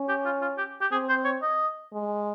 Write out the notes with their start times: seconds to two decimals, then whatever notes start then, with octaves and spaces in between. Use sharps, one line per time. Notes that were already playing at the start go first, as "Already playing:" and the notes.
Already playing: C#4
0.08 G4
0.25 F4
0.41 F4
0.58 G4
0.81 G4
0.92 C4 G#4
1.09 C5
1.25 C#5
1.42 D#5
1.93 G#3